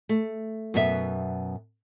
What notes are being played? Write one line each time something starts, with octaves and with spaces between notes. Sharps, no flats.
A3
F#2 B2 B3 E5